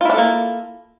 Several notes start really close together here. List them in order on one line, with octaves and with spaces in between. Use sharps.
F4 E4 D4 A4 A#3